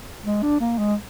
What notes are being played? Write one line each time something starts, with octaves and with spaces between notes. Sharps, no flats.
G#3
D4
A#3
G#3